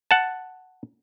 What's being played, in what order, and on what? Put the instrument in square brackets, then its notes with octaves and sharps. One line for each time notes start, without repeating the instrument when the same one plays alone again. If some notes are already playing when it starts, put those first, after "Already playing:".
[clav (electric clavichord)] F#5 A5